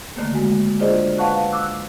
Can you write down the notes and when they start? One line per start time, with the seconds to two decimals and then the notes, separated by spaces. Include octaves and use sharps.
0.16 D3 D#3 A3 A#3
0.33 G#3 F#4
0.80 D4 F4 G#4 C5 D5 D#5
1.18 B4 F5 F#5 A5 C#6 F#6
1.52 D6 E6 F#6